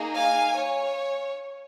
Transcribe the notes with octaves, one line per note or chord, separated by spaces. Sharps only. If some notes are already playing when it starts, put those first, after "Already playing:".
Already playing: A#3 D#4 G#4
F5 G#5
C#5